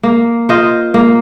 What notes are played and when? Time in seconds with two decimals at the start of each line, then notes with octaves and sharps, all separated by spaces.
0.03 A#3
0.49 F4 C5 D#5
0.94 A#3